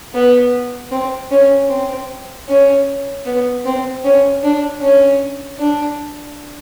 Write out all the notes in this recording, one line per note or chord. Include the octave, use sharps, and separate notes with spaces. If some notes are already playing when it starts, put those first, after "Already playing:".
B3
C4
C#4
C4
C#4
B3
C4
C#4
D4
C#4
D4